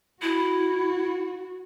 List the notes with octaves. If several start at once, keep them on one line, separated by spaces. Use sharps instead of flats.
E4 F#4